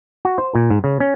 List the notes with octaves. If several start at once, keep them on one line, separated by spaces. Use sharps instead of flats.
F#4
C5
A#2
G#2
C#3
C#4